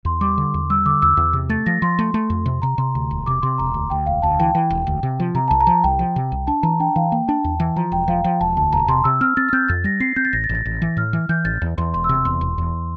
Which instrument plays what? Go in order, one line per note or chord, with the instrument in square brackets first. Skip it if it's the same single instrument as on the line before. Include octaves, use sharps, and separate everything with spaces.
[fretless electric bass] E2 [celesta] C6
[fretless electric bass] G3 [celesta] D6
[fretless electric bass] D3
E2
[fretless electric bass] G3 [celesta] E6
[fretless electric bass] D3 [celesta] D6
[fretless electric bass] E2 [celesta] E6
[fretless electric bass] E2
C3
[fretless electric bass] A3 [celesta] A6
[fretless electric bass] F3 [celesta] A#6
[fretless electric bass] F3 [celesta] C6
[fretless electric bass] A3
A3
F2
C3
[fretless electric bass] C3 [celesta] A#5
[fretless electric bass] C3 [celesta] C6
[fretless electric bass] D2
E1
[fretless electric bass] C3 [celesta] D6
[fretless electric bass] C3 [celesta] C6
[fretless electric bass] E1 [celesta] A#5
[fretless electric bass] D2
[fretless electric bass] D2 [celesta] G5
[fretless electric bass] E1 [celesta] F5
[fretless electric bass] D2 [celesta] A5
[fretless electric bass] E3 [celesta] G5
[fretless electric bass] E3 [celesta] G5
[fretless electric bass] E1
D2
C3
F3
[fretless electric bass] C3 [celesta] A#5
[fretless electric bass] C2 [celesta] A5
[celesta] A#5
[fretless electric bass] F3
[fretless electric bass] C2 [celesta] G5
[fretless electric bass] F3
C3
C2
[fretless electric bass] D4 [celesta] A5
[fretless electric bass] E3 [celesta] A#5
[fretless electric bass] D4 [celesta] G5
[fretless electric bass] E3 [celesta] F5
[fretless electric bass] A#3 [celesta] G5
[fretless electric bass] D4 [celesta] A5
[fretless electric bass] E2
E3
[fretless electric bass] F3 [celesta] A#5
[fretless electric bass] E1 [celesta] G5
[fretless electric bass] F3 [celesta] F5
[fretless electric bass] F3 [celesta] G5
[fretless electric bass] E1 [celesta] A5
[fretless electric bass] D2 [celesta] A5
[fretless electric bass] E1 [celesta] A#5
[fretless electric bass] C3 [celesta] C6
[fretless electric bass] C3 [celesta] E6
[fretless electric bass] C4 [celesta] F6
[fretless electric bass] C4 [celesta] A6
[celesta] F6
[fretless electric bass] C4 [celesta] G6
[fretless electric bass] F2 [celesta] A6
[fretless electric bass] G3 [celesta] A#6
[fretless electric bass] C4 [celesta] C7
[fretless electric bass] C4 [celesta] G6
[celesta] A6
[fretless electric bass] A1 [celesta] A#6
[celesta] A6
[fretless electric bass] A1
[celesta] A6
[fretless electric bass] A1
E3
[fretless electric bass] A2 [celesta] F6
[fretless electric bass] E3
[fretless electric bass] E3 [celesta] G6
[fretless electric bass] A1 [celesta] A6
[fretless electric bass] E2
[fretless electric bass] E2 [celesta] C6
[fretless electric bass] E1 [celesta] C6
[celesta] E6
[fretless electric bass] C3
[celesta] E6
[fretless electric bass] E2 [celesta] C6
[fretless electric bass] E1
E2